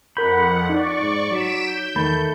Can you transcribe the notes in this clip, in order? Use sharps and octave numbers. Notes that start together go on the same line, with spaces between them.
F2 A#4 F#5 B5 G6
D#4 D5 C#6
G#2
F#3 B6 D7 E7
G6
E2 D#3 A3 B5